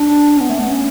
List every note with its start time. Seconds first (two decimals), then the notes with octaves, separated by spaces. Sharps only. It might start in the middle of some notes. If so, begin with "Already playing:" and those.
Already playing: D4
0.37 C#4
0.41 B3
0.50 A3
0.59 B3
0.69 C#4